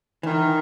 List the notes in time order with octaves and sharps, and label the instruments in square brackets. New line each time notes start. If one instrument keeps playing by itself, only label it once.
[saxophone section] D#3 [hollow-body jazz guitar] E3